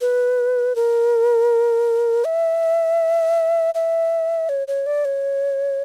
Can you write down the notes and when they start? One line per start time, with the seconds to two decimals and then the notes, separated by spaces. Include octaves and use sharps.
0.01 B4
0.76 A#4
2.25 E5
3.75 E5
4.49 C#5
4.68 C#5
4.86 D5
5.05 C#5